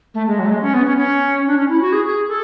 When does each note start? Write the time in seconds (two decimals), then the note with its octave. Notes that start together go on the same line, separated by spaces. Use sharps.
0.14 A3
0.27 G#3
0.39 F#3
0.46 A3
0.50 G#3
0.62 C#4
0.74 B3
0.86 C#4
0.98 C#4
1.47 D4
1.57 C#4
1.69 E4
1.81 F#4
1.93 G#4
2.05 G#4
2.28 A4